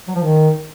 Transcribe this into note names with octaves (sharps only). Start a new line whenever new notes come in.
F#3
F3
D#3